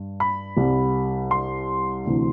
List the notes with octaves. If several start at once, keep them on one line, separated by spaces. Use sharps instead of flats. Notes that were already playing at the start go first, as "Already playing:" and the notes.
Already playing: G2
B5
C2 C3 G3
C6
D2 C3 E3